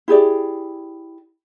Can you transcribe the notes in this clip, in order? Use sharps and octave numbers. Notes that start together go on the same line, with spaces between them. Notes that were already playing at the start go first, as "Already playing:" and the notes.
E4 G4 G#4 D5